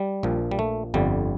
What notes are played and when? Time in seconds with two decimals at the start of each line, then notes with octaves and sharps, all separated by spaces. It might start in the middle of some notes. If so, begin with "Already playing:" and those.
Already playing: G3
0.23 A#1 A#2 F3
0.51 G3
0.59 A3
0.94 G1 F2 D3 G3